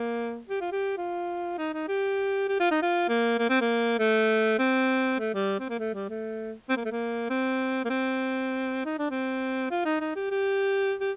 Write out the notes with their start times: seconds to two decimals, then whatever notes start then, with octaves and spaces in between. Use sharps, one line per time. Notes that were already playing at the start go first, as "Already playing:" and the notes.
Already playing: A#3
0.49 G4
0.61 F4
0.72 G4
0.98 F4
1.58 D#4
1.73 D#4
1.88 G4
2.49 G4
2.60 F4
2.71 D#4
2.82 F4
3.09 A#3
3.39 A#3
3.50 C4
3.61 A#3
3.99 A3
4.59 C4
5.20 A3
5.34 G3
5.60 C4
5.69 A#3
5.79 A3
5.94 G3
6.09 A3
6.70 C4
6.77 A#3
6.85 A3
6.91 A#3
7.30 C4
7.85 A#3
7.90 C4
8.85 D#4
8.99 D4
9.11 C4
9.71 F4
9.85 D#4
10.00 D#4
10.16 G4
10.31 G4
11.01 G4